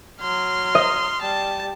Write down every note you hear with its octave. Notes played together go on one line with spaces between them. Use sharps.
F#3 C6 F6
D#5
G3 A5